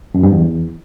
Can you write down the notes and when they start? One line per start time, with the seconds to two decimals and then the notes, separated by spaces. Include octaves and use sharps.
0.14 F#2
0.23 G2
0.32 E2